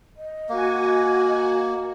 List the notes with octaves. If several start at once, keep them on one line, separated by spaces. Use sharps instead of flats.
D#5
A#3 F#4 G#5